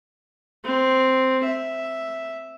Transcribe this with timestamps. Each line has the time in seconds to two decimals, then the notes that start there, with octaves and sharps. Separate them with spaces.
0.65 C4
1.44 E5